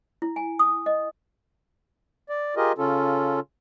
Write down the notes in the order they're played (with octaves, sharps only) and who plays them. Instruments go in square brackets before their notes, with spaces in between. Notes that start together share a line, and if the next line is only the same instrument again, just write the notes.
[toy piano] E4
G#5
D#6
D#5
[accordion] D5
F4 G4 G#4 A#4 D#5
C#3 C#4 F4 A4